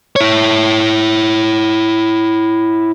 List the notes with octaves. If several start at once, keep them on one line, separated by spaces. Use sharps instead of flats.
E4 C#5